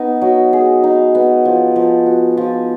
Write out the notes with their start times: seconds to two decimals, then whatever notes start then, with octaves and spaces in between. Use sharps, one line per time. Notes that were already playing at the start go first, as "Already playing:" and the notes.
Already playing: B3 D#4
0.22 F#3
0.53 G#4
0.84 D#4
1.15 B3
1.45 F3
1.76 F3
2.06 F#4
2.37 F3